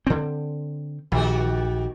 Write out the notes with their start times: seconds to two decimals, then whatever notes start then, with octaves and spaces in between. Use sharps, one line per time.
0.07 D3 C4
1.12 A#1 D#3 F#4 G4